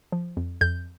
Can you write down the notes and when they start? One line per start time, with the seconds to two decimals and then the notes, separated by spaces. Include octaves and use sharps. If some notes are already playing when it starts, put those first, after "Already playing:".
0.12 F3
0.37 F2
0.61 F2 G6